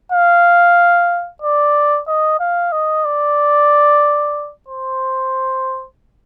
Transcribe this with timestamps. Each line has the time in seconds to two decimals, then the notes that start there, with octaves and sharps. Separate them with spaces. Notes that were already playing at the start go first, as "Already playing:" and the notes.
0.12 F5
1.42 D5
2.08 D#5
2.40 F5
2.72 D#5
3.05 D5
4.68 C5